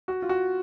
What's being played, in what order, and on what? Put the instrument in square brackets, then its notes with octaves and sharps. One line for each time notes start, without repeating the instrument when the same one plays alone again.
[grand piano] F#4
F4
F#4